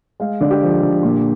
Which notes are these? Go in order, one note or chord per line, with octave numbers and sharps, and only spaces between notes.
G#3 F5
D3 D5
G4
F3
D3
A#2